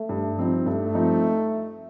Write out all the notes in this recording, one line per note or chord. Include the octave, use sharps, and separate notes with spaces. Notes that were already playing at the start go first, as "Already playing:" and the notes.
Already playing: A3
G2
F3 C4 D#4
G2 A3
F3 C4 D#4